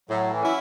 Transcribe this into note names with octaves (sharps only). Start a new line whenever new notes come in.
A2 F#3
E3
F#3 C#4 E4